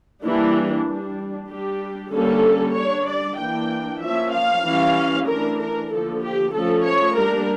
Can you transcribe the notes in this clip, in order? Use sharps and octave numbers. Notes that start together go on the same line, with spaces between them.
E3 G3 A#3 D4 E4
G3 D4
G3 D4 G4
D3 G3 A#3 C#4 A4
G3 D4 C#5
D5
E3 A#3 D4 G5
F3 A#3 C#4 E5
F5
E3 G3 C#4
E3 A3 D4 A#4
A#4
D3 F3 A#3 A4
G4
F3 A3 C#4 A4
C#5
G3 A#3 D4 A#4